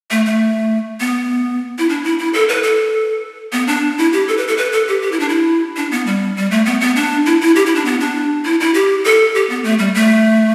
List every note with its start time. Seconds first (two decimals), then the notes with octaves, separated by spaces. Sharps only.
0.11 A3
0.26 A3
1.00 B3
1.79 E4
1.89 D4
2.04 E4
2.19 E4
2.34 A4
2.49 B4
2.63 A4
3.53 B3
3.68 D4
3.98 E4
4.13 G4
4.28 A4
4.37 B4
4.48 A4
4.57 B4
4.72 A4
4.88 G4
5.02 G4
5.12 E4
5.20 D4
5.29 E4
5.77 D4
5.92 B3
6.07 G3
6.37 G3
6.51 A3
6.66 B3
6.81 B3
6.96 D4
7.26 E4
7.41 E4
7.56 G4
7.66 E4
7.75 D4
7.85 B3
8.00 D4
8.45 E4
8.60 E4
8.74 G4
9.04 A4
9.35 G4
9.50 B3
9.64 A3
9.79 G3
9.95 A3